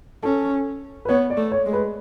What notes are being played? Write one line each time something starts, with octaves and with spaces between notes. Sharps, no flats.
C#4 A4
B4
B3 C#5
D5
A3
C#5
G#3
B4